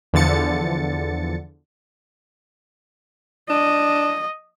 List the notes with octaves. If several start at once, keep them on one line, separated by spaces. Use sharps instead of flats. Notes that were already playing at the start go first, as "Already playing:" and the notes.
E2 D3 F3 A6 C#7
D4 D#5